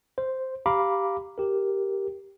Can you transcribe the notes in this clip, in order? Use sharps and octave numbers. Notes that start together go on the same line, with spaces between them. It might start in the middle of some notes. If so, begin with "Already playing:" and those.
C5
G4 F5 A#5 B5 D6
G4 A#4